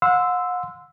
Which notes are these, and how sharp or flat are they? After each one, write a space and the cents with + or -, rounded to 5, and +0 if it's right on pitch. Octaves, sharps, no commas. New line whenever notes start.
F#5 -40 C6 -20 E6 +0